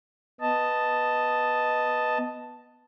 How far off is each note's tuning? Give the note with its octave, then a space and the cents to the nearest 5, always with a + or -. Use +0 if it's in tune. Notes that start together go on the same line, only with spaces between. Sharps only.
B3 +0 D#5 +0 A5 +0